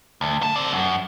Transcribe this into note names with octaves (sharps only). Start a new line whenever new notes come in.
D2
G#2 A5
C4 D5
F#2